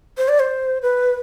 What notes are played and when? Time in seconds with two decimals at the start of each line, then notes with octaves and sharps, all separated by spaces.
0.18 C5
0.29 D5
0.40 C5
0.82 B4